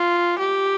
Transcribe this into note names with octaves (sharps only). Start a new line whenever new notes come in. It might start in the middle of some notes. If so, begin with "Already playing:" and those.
Already playing: F4
G4